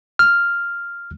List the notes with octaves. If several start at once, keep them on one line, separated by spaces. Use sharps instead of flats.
F6